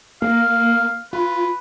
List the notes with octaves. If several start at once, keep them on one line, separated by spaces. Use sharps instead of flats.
A#3 F5
F4 B4